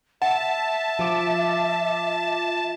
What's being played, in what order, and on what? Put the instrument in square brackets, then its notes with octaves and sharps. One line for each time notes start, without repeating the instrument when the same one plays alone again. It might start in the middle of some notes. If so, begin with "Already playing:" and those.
[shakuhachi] E5 [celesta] F#5 [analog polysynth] A5
[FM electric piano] F3 F4 D6